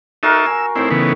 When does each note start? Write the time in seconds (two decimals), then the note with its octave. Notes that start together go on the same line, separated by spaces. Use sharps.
0.23 D#4 F#4 A4 A#4 E5 F5
0.46 G#5 E6
0.76 A2 D#3 C4 E4
0.90 C#3 E3 B3